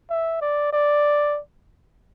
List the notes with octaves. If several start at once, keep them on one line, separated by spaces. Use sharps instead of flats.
E5
D5
D5